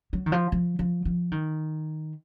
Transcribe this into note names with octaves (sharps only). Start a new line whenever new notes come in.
F#3
D#3
F3
F3
F3
F3
D#3